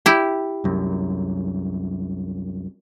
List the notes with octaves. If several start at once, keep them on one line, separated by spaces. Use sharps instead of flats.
E4 G4
C2 F#2